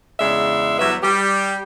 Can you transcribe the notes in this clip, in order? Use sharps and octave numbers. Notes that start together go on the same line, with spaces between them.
E2 C#3 G#3 D4 E5
E2 F#3 G3 F#4 B4 E5
G3 G4